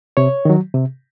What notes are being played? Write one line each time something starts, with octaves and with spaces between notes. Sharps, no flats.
C3 C#5
D#3 F#3
C3